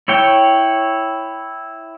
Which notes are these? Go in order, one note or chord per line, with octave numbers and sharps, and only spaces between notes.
E4 C#5 G5